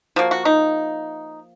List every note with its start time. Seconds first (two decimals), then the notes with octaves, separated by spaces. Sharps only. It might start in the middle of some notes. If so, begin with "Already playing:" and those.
0.16 F3 A#3 F#4
0.31 F#4
0.45 D#4